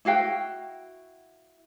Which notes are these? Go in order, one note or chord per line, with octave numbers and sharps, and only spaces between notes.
E4 F#4 F5 G5